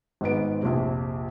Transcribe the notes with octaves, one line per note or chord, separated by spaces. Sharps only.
G#1 G#2 B3 D7
A#1 F2 C3